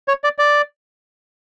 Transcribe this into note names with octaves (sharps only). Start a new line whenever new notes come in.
C#5
D5
D5